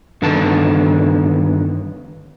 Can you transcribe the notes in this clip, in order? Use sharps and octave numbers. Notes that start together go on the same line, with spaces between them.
G2 D3 D#3 B3 A5